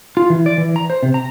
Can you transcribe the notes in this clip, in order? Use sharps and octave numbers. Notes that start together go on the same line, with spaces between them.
F4
E3
D5
E3
A#5
C5
C3
A#5